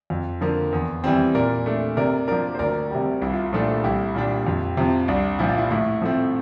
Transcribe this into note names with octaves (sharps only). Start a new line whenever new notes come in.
F2
D3 F3 A#3
E2
E3 G3 C4
A#2 A#4 D5
A3 D4
C3 A#4 D5
F3 A#3 D4 A#4 D5
C5
D2 A#4 D5
C3 G3
C2 E4
F4
E4
A#2 F3 A3 D4
C2 E4 G4
A#2 G3 D4
F2
C3 F3
C2 D4
A#2 F3 E4
F4
E4
A2 E4
F3 A3 C4